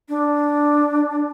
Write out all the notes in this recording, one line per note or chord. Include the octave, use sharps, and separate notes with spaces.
D4